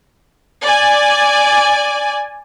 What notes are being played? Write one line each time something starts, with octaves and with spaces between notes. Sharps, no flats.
D5 G#5